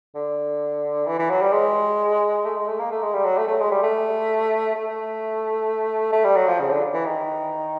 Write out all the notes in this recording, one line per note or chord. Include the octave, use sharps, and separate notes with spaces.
D3
E3
E3
F#3
G3
G#3
A3
G#3
A3
A#3
A3
G#3
G3
F#3
A3
A3
G#3
G3
A3
A3
A3
G3
F#3
F3
C#3
D3
E3
D#3